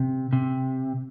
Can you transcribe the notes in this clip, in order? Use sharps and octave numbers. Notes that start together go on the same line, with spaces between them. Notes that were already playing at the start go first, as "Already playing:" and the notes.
Already playing: C3
C3